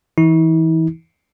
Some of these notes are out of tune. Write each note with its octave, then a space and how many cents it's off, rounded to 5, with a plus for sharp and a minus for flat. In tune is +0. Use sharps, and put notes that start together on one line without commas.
E3 -15 E4 -45